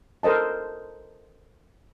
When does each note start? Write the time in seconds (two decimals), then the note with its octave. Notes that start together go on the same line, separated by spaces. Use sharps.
0.23 A4 A#4 C5 D#5 A5